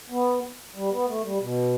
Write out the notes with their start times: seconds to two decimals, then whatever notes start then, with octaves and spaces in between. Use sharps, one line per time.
0.10 B3
0.75 G3
0.91 B3
1.07 A3
1.24 G3
1.40 B2